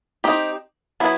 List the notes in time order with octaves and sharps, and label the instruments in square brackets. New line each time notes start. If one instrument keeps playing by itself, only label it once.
[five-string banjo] C4 D#4 G4
F#3 B3 E4